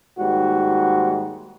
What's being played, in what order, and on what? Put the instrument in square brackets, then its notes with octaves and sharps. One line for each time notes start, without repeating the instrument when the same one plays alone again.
[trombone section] D#2 G#2 G3 F#4